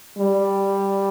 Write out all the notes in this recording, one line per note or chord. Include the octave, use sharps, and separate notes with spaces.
G3